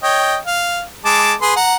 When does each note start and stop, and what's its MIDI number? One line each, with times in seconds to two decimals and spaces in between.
0.03 0.37 73
0.03 0.37 75
0.03 0.37 79
0.46 0.82 77
1.05 1.33 56
1.05 1.33 81
1.05 1.33 86
1.42 1.54 68
1.42 1.54 71
1.42 1.54 84
1.56 1.76 78
1.56 1.76 82